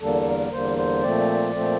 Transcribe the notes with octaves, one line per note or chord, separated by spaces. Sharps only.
E2 D3 G3 A#3 A4
A#4
E2 D3 G3 A#3 C5
C5
A#2 F3 A3 C4 D5
A#2 F3 A3 C4